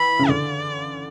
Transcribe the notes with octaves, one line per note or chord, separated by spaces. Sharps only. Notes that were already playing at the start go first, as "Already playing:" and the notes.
Already playing: E3 B5
C#3
D3 D5